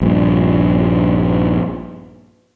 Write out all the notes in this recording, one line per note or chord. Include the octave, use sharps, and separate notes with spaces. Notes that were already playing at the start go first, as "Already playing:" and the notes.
A#1 G2